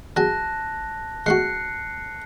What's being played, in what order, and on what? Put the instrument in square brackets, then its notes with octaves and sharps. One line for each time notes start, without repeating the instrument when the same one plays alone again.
[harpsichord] F#3 G#4 [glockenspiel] A5 F#6 A#6
[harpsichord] G#3 A3 F#4 [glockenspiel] F#6 C7 C#7